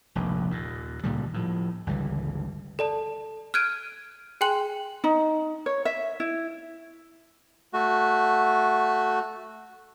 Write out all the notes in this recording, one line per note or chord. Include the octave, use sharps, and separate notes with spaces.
F1 A#1 D#2 G#2
D#2 A#2
C#2 A#2 D#3 G3
A2 F3
G1 C#2 E3 G3
A4 D5 A5
F6 F#6 G#6 D7 D#7
G#4 G5 G#5 C6 F#6 F#7
D#4
C#5
E5
E4
A3 F#4